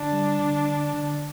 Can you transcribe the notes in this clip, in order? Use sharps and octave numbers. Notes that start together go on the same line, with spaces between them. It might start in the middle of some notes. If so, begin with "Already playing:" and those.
Already playing: D3 D4
G3
D3
D3
D3